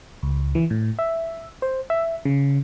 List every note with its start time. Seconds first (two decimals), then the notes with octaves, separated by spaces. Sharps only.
0.23 C#2
0.55 E3
0.70 A2
0.99 E5
1.62 C5
1.90 E5
2.25 C#3